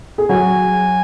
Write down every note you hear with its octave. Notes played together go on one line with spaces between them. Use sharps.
G#4
F#3 F#4 G#5